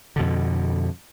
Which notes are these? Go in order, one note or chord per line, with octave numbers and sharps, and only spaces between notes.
F2 B2 D3